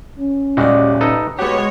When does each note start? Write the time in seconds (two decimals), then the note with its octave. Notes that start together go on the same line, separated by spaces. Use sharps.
0.19 C#4
0.57 D#1 G3 G#3 F#4 D5
1.01 D#4 A4 B4
1.39 G#3 B3 F#4 G4 C#5